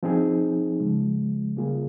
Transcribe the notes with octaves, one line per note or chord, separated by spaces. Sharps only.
F3 C4 D#4 G#4
C#3 F3 G#3
C#3 G3 A#3 F4 G#4